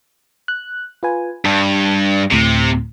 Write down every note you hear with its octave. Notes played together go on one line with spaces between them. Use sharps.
F#6
F4 B4 G#5
G2 A5
D2 A2 C3